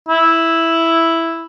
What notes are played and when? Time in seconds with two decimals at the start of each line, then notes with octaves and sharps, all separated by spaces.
0.09 E4